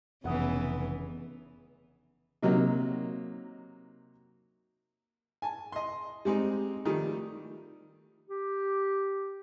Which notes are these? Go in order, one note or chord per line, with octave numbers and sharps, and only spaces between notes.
F1 C#3 E3 B3 F#5 D#6
C3 F#3 A#3 D#4
G#5 A5
D#5 C6
G3 G#3 C4 D#4
D#3 F3 G3 A3
G4